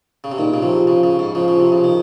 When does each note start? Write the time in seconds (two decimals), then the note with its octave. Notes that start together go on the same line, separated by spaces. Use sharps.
0.24 C#3
0.32 C3
0.38 A#2 D#3
0.54 C#3
0.63 C3 F3
0.87 C#3
1.04 C#3
1.19 G#2
1.35 C#3 F3
1.48 C#3
1.60 C3
1.72 C#3
1.84 D#3